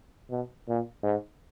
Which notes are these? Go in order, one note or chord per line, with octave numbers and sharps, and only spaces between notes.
B2
A#2
G#2